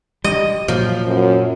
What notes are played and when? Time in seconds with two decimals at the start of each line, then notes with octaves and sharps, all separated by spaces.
0.24 G3 D#5
0.68 A#2 F3 F#3
1.07 F#2